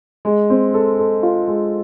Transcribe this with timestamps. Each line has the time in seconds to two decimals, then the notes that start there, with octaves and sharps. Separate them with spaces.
0.25 G#3
0.50 C4
0.74 A4
0.99 A4
1.23 F4
1.48 G#3